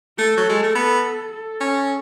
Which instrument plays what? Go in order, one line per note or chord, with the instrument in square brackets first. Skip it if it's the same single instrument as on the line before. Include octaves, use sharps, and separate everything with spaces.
[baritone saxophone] A3 [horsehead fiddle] A4
[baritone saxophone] F#3
G#3
A3
[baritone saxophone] B3 [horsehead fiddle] A4
[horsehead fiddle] A4
[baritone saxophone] C#4